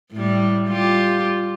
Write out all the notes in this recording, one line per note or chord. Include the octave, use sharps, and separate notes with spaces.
A2 G3
G3 F4 G4